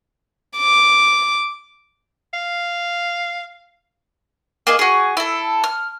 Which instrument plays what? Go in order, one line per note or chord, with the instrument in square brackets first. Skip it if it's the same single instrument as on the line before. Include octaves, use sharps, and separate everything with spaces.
[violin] D6
[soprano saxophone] F5
[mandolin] A#3 G#4 D#5
F#4 G#4
E4 A4
F6